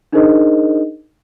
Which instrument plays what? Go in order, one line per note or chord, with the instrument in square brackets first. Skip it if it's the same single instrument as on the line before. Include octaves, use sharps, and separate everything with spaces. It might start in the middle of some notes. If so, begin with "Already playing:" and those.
[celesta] D4 D#4 G#4 A#4 C5 D#5